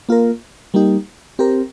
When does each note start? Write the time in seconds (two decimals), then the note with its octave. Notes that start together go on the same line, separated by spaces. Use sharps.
0.09 A#3 F4 A#4
0.74 G3 A#3 D#4 G4
1.39 C4 G4 A#4